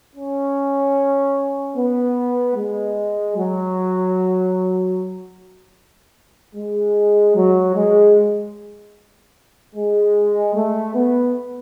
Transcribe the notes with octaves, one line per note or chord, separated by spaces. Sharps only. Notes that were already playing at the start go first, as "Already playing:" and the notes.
C#4
B3
G#3
F#3
G#3
F#3
G#3
G#3
A3
B3